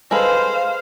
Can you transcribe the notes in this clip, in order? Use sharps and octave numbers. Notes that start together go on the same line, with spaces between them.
G#3 A4 B4 C5 F5